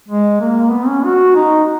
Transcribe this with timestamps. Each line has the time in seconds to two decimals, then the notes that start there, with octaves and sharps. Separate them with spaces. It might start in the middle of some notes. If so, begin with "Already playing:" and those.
0.08 G#3
0.40 A#3
0.71 B3
0.87 C#4
1.04 F#4
1.35 D#4